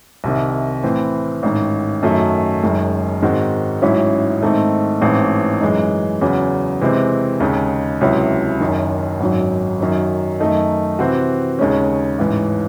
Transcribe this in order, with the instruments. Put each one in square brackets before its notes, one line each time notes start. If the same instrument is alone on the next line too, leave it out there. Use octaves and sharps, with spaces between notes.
[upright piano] C2 C3 D#3
A2 E3 C4
A1 G#2 D#3
F#2 D#3 F#3 A3
F#1 F#2 D#3 G#3
G#2 D#3 G#3 C4 F#4
A1 G#2 F#3 C#4 E4
G#2 D#3 A3 C4 D#4
A1 G#2 E3 A3 C4
F#2 E3 G#3 D#4
E2 C#3 F#3
C3 E3 G#3 C4
D#2 C#3 G#3 D#4
C#2 C3 F#3 C#4 E4
F#1 F#2 D#3
G#1 F#2 D#3 F#3
F#2 D#3 F#3
F#2 D#3 A3 D#4
C3 E3 C4 F#4
D#2 C#3 G#3 C#4
A1 G#2 E3